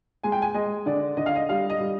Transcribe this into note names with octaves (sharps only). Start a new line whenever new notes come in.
G#3 G#5
G5
G#5
G#3 D#5
D3 D5
D3 D#5
F5
D#5
G3 F5
D#5
G3